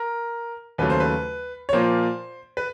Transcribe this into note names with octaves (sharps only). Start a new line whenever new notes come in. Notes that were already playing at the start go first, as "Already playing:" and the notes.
Already playing: A#4
D#2 C#3 F#3 A3 B4
C5
B4
C#5
A#2 F3 A#3 C5
B4